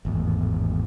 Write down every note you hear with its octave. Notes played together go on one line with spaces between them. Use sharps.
G#1 E2 A2